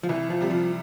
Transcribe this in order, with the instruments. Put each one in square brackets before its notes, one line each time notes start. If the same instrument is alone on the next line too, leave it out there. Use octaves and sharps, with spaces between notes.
[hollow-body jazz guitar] F3
[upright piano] C2 [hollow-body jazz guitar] E3
[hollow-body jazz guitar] F3
[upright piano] C3 G3
[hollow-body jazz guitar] F3